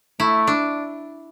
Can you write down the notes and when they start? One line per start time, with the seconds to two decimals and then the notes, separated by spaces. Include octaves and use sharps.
0.20 A3 E4
0.47 D4